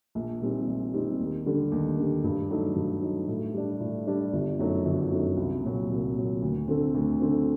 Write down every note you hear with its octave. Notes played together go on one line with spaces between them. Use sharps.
A#1
A#2 G3 C4 D#4
A#1
A#2 G3 C4 D#4
D#2
D3 G3
D#2
D3 G3
G2
F#3 A3 D#4
G2
F#3 A3 D#4
A2
G3 D4
A2
G3 D4
G1
F#2 F#3 A3 D#4
G1
F#2 F#3 A3 D#4
C2
A#2 F#3
C2
A#2 F#3
D2
D3 A3 C4
D2
D3 A3 C4